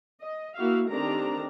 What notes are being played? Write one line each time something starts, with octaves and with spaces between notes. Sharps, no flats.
D#5
A#3 E4 F#4 E5 F5
D#3 A3 C4 D4 G4 A#5